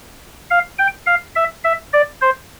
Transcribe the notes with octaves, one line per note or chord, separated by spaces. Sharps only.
F5
G5
F5
E5
E5
D5
C5